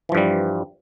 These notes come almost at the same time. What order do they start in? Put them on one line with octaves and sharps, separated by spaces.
E3 F3 G2 G3